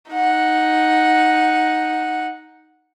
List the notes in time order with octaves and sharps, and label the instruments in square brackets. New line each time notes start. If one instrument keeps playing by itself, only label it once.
[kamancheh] D#4 F#5